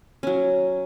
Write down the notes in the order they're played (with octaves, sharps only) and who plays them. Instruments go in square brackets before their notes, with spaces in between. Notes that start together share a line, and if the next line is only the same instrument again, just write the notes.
[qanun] F#3 C#4